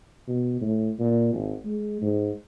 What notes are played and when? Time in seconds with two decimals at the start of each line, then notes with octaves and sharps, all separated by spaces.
0.28 B2
0.61 A2
0.99 A#2
1.34 G#1
1.65 G#3
2.02 G#2